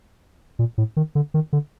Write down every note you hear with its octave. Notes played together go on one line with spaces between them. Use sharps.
A#2
A2
D#3
D3
D#3
D3